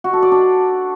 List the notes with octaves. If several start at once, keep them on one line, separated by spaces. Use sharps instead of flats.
F#4
A4
D5
D4